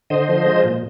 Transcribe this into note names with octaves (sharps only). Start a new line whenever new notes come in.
D3 C5 D#5
F3
G#3
A#2